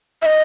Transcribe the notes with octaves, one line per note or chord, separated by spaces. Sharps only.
E5
D#5